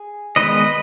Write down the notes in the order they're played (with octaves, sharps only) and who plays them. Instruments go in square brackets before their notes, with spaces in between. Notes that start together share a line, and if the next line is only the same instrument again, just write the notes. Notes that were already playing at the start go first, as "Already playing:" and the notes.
Already playing: [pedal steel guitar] G#4
D#3 G#3 B3 B4 D#5